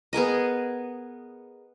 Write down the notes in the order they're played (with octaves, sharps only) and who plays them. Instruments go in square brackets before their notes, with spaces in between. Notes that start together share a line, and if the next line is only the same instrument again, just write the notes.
[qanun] B3 G#4 A#4 D#5